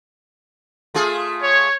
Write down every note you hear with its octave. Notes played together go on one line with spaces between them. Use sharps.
A3 F4 G#4
C#5